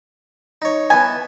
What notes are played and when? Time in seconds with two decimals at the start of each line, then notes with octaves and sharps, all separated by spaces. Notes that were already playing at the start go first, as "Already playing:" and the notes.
0.62 D#4 C#5
0.90 E3 B3 G#5